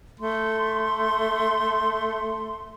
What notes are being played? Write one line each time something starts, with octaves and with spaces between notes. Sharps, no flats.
A3 C6